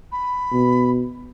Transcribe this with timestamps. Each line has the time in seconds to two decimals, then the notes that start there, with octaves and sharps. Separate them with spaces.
0.12 B5
0.52 B2